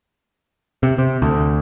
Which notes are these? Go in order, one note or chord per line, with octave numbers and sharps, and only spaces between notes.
C3
C3
D2